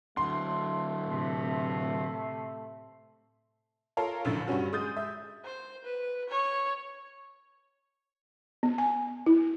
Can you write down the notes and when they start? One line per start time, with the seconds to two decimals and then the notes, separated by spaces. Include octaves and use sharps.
0.17 D3 F#3 A3 C6
1.06 A2 C3
3.97 F4 A4 A#4 C#5 F5
4.25 A#1 F#2 A2 D3 A6
4.47 G2 G3 C#4 F#4
4.73 G#3 D#6 G6 A6
4.97 E5
5.45 C5
5.85 B4
6.29 C#5
8.63 B3
8.78 G#5
9.26 E4